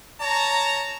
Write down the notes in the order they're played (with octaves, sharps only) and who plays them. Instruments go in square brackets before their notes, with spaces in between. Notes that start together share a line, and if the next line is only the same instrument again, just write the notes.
[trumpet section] C#5 A5 A#5